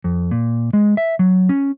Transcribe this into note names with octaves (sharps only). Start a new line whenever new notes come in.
F2
A#2
G#3
E5
F#3
C#4